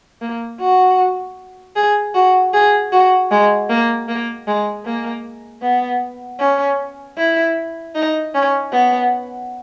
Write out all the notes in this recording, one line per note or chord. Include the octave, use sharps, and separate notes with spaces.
A#3
F#4
G#4
F#4
G#4
F#4
G#3
A#3
A#3
G#3
A#3
B3
C#4
E4
D#4
C#4
B3